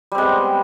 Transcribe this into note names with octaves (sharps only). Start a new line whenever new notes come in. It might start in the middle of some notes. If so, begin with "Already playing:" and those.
G3 G#3 B3 C4